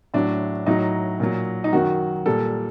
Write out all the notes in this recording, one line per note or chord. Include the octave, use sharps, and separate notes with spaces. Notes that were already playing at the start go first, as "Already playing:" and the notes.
A2 F#3 D4
A2 F#3 D#4
A#2 F#3
D#4
F#2 D#3 F#3 F#4
A#2 G3 A4